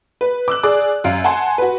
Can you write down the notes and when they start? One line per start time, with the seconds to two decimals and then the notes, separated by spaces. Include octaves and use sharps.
0.21 B4
0.48 D6 E6 F#6
0.63 G#4 D5 D6
1.04 F#2 F5 D7
1.24 F#5 G#5 A5 C6
1.58 F#4 B4